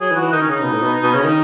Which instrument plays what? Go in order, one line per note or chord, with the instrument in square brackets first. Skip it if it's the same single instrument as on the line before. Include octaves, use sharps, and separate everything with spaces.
[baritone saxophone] F#3 [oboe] G#4
[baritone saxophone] E3
[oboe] F#4
[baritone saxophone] E3
[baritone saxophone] D#3 [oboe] D#4
[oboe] C#4
[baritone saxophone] C#3 [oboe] D#4
[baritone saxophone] B2
A2
B2
B2
[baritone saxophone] C#3 [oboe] C#4
[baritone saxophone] D#3 [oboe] D#4